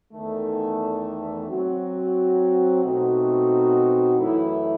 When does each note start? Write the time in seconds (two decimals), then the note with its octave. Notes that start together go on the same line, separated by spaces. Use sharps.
0.13 E2 D#3 A3
1.48 F#3 C4 F#4
2.83 B2 A3 C4 D#4 F#4
4.19 F#2 E3 A3 E4